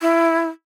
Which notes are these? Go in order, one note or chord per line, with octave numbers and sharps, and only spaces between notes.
E4